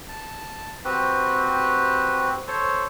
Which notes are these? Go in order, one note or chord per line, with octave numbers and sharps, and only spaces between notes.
A5
C4 F#4 G4 B4
A4 C5 C#5